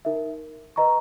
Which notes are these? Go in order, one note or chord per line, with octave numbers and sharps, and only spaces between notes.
D#4 A#4 E5
B4 D#5 A#5 C#6